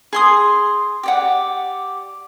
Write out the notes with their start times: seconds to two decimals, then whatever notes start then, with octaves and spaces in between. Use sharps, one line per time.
0.13 G#4 C6 D#6
1.03 G4 D5 F#5